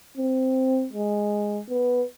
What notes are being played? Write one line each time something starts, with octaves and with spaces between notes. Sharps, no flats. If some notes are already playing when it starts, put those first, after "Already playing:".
C4
G#3
B3